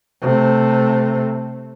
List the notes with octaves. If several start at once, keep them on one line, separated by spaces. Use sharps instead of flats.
C3 A3